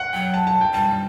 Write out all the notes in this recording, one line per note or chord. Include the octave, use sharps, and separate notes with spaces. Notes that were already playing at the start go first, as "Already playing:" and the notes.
Already playing: F#5
F#3 G5
A5
A5
G5
G3 A5